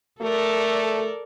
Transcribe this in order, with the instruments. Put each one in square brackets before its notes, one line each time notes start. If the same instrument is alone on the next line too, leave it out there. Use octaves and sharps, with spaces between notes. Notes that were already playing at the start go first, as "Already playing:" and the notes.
[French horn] A3 [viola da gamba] A4 A#4 D5